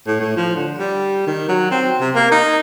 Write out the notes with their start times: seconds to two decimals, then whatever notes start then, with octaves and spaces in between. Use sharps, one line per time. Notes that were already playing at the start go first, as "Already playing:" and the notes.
0.08 A2
0.20 A2
0.37 F3
0.56 D3
0.79 G3
1.27 D#3
1.49 F#3
1.71 C4
2.01 C3
2.15 A#3
2.32 D#4